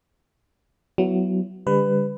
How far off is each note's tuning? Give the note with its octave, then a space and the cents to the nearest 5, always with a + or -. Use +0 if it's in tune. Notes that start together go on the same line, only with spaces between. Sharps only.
F#3 +15 B3 +10 E4 +25
D3 -15 G3 +30 B4 +20